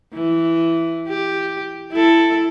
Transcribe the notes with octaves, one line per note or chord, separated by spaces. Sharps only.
E3
G4
E4 A4